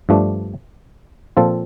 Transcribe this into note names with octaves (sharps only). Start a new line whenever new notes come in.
G2 F3 A3 D4
A#2 F3 C4 F4 A4